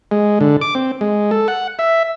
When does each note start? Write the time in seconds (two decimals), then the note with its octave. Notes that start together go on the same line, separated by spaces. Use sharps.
0.11 G#3
0.41 D3
0.61 D6
0.75 C4
1.01 G#3
1.31 A4
1.48 F#5
1.79 E5